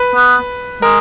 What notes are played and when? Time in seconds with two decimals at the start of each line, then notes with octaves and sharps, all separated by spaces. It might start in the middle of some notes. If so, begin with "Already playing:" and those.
Already playing: B4
0.15 B3
0.82 G#3 A#4